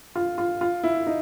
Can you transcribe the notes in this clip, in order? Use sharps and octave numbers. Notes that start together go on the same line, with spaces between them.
F4
F4
F4
E4
D#4